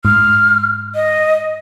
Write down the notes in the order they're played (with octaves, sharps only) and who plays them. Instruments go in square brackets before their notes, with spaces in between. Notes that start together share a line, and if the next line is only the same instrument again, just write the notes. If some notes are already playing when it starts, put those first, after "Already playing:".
[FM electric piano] G#2 [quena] F6
[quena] D#5